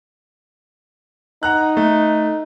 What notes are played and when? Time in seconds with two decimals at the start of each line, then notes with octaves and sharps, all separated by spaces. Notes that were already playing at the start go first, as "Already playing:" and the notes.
1.43 D#4 F#5 A#5 F#6
1.77 A3